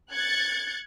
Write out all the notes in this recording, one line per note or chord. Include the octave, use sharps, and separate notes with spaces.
F#6 G#6 A6 C#7